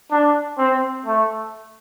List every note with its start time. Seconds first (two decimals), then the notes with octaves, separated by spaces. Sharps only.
0.11 D4
0.58 C4
1.06 A3